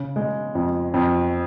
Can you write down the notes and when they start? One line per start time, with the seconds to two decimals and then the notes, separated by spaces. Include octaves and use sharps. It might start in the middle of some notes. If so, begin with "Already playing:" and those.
Already playing: C#3
0.16 G#3
0.55 F2
0.94 F2